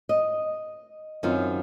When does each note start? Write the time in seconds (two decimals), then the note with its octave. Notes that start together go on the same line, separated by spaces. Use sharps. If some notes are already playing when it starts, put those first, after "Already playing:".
0.09 D#5
1.23 F#2 D#3 C4 D#4 F4